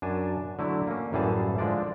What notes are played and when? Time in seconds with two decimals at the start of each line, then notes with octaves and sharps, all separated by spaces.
0.02 F#2 D4 G#5 A5
0.59 D3 F#3 A3 E4
0.87 A#3 C#4
1.12 A1 F#2 E3 G3 G#4 A5
1.58 D3 F3 G#3 D4 D5